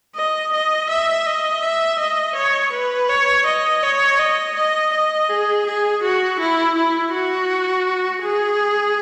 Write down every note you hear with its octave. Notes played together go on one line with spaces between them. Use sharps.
D#5
D#5
E5
D#5
E5
D#5
C#5
B4
C#5
D#5
C#5
D#5
D#5
D#5
G#4
G#4
F#4
E4
E4
F#4
G#4